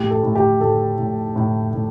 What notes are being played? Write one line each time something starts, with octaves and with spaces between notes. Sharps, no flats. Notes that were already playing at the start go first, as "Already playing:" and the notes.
Already playing: A2 G4
A4
A2
G4
A2 A4
A2
A2
A2